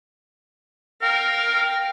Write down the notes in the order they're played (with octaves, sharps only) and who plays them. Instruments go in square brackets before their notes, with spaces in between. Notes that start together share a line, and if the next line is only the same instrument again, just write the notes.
[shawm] A#4 [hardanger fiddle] F5 G5